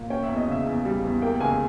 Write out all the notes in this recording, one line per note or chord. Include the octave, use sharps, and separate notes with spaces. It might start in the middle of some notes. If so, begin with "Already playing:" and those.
Already playing: A#2
C#4 G5
E5
E2
D#5
C#3 E5
E2
G3
E2
A#3 G5
C#2 G#5